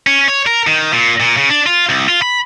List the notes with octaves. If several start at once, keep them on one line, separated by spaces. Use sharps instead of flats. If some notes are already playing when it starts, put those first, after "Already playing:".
C#4
C#5
A#4
D#3
A#2
A#2
C#3
D4
F4
C2
F4
B5